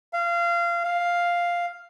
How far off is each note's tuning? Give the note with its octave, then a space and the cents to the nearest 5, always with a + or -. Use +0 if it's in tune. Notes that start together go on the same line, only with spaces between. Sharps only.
F5 -25
F5 +0